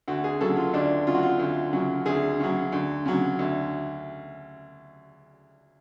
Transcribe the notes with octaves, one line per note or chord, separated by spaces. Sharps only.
D2 F#4
G#4
C#3 F#3 A4
F4
D2 D4
C#3 F#3 F4
F#4
F4
D2
C#3 F#3
D2 G#4
C#3 F#3
D2
C#3 F#3
D2